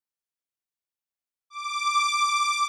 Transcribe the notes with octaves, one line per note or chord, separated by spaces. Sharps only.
D6